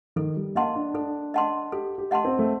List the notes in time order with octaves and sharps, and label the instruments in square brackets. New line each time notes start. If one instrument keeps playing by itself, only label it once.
[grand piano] D#3 [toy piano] A4
[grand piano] G3
[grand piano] A#3 [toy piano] D#5 F#5 A5 C6
[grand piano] D4
[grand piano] D4 [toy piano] A4
[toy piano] D#5 F#5 A5 C6
[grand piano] G4 [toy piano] A4
[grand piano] G4
[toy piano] D#5 F#5 A5 C6
[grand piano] C4
A3